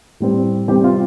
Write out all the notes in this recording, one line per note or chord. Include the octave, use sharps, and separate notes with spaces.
A2 G3 C4
C3 G3 C4 G4
F4